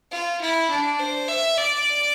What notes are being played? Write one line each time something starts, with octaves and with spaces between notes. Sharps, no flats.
F4
E4
D4
C5
E5
D5